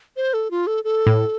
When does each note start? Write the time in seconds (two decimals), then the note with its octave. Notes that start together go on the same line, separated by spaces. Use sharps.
0.17 C5
0.34 A4
0.51 F4
0.67 A4
0.84 A4
1.07 A2